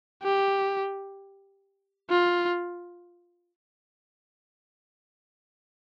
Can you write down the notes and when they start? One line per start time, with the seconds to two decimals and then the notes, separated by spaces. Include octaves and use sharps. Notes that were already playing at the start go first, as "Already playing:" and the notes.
0.23 G4
2.10 F4